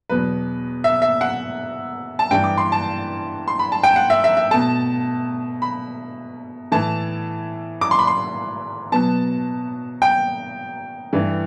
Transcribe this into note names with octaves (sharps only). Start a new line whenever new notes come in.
E2 B2 F#3 B4
E5
E5
F#5
A5
G2 E3 G3 G5
D6
C6
A5
C6
B5
A5
G5
F#5
E5
E5
E5
B2 A3 A5
B5
A2 E3 A3 A5
D6
C6
B5
C6
B2 F#3 B3 A5
G5
G2 E3 A3